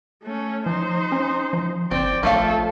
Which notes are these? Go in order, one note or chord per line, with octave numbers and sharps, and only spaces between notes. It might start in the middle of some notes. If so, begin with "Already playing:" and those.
A3 C#4
F3 D#4 C5
C#4
F3
G1 C4 D5 G5
A#1 F3 A3 A4 F5